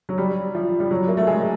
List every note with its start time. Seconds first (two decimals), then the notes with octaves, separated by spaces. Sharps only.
0.09 F#3
0.18 G3
0.55 F3
0.80 G3
0.91 F#3
1.08 A#3
1.17 A3
1.27 G#3